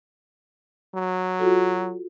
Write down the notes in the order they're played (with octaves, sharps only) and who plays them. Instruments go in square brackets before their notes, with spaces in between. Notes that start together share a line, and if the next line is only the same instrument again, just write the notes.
[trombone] F#3
[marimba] F4 F#4 A4